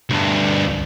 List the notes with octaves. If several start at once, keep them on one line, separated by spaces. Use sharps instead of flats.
D2 G2